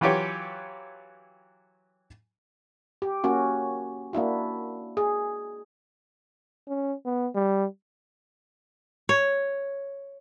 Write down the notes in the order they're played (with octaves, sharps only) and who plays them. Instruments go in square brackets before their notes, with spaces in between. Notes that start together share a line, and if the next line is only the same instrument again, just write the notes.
[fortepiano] E3 F#3 F4 G4 B4 C#5
[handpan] G4
A#3 C#4 F#4
A#3 D4 E4 F#4
G#4
[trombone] C#4
B3
G3
[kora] C#5